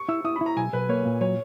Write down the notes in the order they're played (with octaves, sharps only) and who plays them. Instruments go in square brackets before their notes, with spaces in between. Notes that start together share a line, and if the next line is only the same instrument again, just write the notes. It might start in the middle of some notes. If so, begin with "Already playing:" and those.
Already playing: [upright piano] C#6
[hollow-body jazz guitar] E4 [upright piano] E6
[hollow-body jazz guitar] E4 [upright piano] D#6
[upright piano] B5
[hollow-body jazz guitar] E4
[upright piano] A#5
[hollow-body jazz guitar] B1 [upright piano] G#5
[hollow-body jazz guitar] B1 [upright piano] B4
[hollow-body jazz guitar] A#3 [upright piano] C#5
[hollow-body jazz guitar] A#2
[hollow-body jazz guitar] F#3 [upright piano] C#5